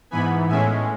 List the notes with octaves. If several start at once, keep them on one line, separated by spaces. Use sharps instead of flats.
G#2 E3 B3 G#5 B5
A2 G#3 C#4 E5 G#5